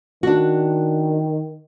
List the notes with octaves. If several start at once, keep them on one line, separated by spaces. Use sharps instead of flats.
D#3 D4 F#4